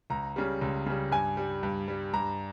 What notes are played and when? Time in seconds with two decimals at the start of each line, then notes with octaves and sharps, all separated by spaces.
0.10 C#2 A#5
0.36 C#3 G3
0.62 C#2
0.86 C#3 G3
1.11 G2 G#5
1.37 G3
1.63 G2
1.88 G3
2.14 G2 A#5